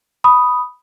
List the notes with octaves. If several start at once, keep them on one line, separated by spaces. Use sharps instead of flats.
B5 D#6